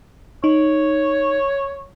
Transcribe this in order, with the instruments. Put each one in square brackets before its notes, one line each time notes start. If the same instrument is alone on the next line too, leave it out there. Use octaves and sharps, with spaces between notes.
[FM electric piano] D#4 [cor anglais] C#5